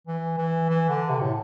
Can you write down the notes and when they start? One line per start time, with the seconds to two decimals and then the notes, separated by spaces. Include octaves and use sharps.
0.07 E3
0.37 E3
0.69 E3
0.89 D3
1.09 C3
1.21 A2